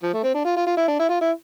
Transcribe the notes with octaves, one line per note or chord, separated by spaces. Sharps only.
F3
A3
C4
D4
F4
F4
F4
E4
D4
E4
F4
E4